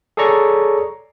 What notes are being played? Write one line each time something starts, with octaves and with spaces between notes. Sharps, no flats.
G#4 A4 C#5 D5 A#5 C#6